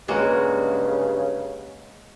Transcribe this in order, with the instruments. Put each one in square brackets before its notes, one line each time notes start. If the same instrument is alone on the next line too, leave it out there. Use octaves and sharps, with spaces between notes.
[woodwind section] G2 C#3 [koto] G#3 A#3 F#4